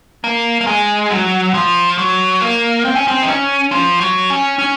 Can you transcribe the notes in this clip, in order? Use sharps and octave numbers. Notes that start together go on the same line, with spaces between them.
A#3
A#3
G#3
F#3
F3
F#3
A#3
C4
C#4
C4
D#4
C#4
F3
F#3
C#4
C#4